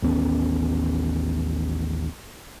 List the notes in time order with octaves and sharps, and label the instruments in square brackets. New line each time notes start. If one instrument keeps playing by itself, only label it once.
[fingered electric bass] A1 D#2 B3 C#4